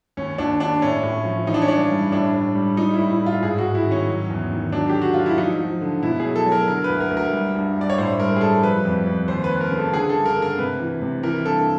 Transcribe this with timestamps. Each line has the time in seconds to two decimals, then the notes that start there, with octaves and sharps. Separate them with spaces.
0.17 D#2 C#4
0.38 D#2 D4
0.60 D#2 D4
0.82 A2 C#4
1.03 A2
1.25 F3
1.47 E3 D#4
1.54 D4
1.62 C#4
1.68 G2 D4
1.91 G3
2.12 A2 D4
2.34 A2
2.55 G3
2.77 G3 D#4
2.94 E4
2.99 A2
3.10 E4
3.21 A2
3.26 F4
3.43 G#2 G#4
3.58 F#4
3.64 G#2
3.75 E4
3.86 D#3
3.91 C#4
4.07 F#3
4.30 E2
4.51 D#3
4.72 F#3 D4
4.90 D3 G4
5.02 F#4
5.14 F#3 F4
5.26 E4
5.38 F3 D#4
5.59 F3
5.81 D3
6.03 B2 E4
6.20 G#4
6.25 F#3
6.36 A4
6.46 F#3
6.52 A#4
6.68 D3 A#4
6.84 B4
6.90 D2
7.00 A#4
7.11 D2
7.17 A#4
7.33 G3
7.55 G2
7.76 G2 D5
7.90 C#5
7.98 A2 C5
8.20 G3 A#4
8.36 G#4
8.41 G3 A4
8.63 F3 B4
8.85 F2
9.07 F2
9.28 D#2 C5
9.44 B4
9.50 D#2
9.61 A#4
9.71 C#3
9.78 A4
9.93 D3 G#4
10.09 A4
10.15 G2
10.26 A#4
10.37 D3
10.42 A#4
10.58 C3 B4
10.80 E3
11.02 C3
11.23 E3 A#4
11.45 G2 A4